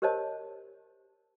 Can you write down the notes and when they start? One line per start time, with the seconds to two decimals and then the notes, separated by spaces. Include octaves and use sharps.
0.02 G4 A#4 C5 C#5 D#5 A5